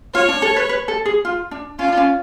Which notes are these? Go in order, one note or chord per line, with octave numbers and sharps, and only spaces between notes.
F4 C#5
D4
A4
B4
B4
A4
G#4
F4
D4
C#4 F4
D4
C#4